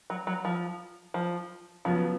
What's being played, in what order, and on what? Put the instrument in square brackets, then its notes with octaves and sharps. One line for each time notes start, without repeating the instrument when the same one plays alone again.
[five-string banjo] F#3
F#3
F3
F3
[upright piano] C#3 F#3 B3 F4 [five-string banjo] F3